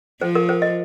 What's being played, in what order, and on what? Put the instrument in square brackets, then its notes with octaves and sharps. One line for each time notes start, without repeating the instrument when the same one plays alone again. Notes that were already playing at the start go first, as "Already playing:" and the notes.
[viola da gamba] F3 [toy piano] C5
[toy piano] A#4
C5
D#5